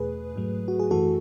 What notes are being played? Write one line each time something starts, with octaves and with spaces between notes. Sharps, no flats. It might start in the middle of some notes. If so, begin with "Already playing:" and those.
Already playing: E2 B2 A3 G#4 B4
G#2 F#3 A3
F#4
G#4
F#2 E3 A3 F#4 A4